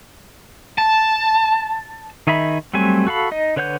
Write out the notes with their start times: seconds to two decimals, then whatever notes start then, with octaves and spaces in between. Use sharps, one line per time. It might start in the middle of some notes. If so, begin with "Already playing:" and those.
0.78 A5
2.27 D#3 D#4 G#4 E5 B5
2.74 F#3 G3 A3 C4 G#5
3.07 F#4 A4 F5 B5
3.31 D#4 D#5
3.56 D3 B4 C#5 F#5 G6